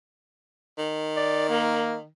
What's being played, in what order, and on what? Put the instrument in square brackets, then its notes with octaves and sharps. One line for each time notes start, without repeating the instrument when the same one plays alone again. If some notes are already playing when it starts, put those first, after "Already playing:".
[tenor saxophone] D#3
[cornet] D5
A#3